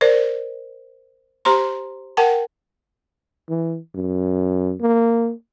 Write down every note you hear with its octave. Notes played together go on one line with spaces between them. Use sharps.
A#4 C5 D5
G4 C5 A#5 C6
A#4 F#5 G5 A5
E3
F#2
A#3